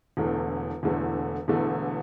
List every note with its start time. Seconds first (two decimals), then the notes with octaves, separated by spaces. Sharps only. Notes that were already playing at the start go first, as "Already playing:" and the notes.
0.17 E1 E2 D3 A3
0.83 E1 E2 D3 A3
1.48 E1 E2 D3 A3